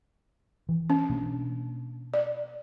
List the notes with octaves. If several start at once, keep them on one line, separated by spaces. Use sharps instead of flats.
E3
C#4
B2 A#3 D4
D5